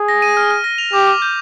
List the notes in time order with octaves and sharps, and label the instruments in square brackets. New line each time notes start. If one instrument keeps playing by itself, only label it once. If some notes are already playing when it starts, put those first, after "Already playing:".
Already playing: [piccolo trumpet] G#4
[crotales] A#6
D#7
F6
F6
A#6
F7
[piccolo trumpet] G4 [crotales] D6
[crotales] D6
G6